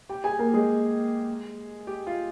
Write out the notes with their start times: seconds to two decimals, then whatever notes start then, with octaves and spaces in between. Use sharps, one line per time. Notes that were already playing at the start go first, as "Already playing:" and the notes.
0.09 G4 G5
0.24 G#4 G#5
0.39 A#3 A#4
0.54 G#3 G#4
1.87 G4
2.07 F4